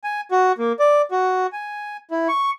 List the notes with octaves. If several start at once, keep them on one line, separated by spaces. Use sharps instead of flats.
G#5
F#4
A#3
D5
F#4
G#5
E4
C#6